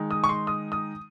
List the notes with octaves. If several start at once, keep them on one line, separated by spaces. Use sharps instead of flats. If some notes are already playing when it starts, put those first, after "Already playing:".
Already playing: D#3 G#3 D#4
D#6
C#6
C6
D#6
D#6